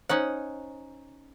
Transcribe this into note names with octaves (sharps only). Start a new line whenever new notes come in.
C#4 D#4 C5 F#5